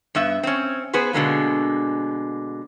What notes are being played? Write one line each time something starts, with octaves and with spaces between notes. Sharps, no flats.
G2 B3 E5
C4 C#4
B3 G#4 B4 C5
B2 D3 G#3 A#3